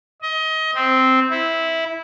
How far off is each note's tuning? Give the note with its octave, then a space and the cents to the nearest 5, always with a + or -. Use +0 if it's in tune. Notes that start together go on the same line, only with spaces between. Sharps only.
D#5 +25
C4 -5
E4 -10